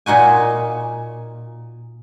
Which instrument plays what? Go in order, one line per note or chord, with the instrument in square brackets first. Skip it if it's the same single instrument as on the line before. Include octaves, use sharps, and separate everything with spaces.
[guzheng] A#2 D#4 F#4 G#5